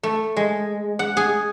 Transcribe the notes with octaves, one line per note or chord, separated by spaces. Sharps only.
A3
G#3
F#5
G#4